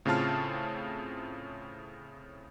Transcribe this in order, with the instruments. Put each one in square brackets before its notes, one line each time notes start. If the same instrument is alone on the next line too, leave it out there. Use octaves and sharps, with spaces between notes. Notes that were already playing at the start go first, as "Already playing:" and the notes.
[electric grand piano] A2 C#3 C4 F4 A5 F6